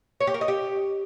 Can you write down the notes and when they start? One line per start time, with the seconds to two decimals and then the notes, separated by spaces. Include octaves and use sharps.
0.20 C#5
0.27 G4
0.34 A#4
0.41 D#5
0.48 G4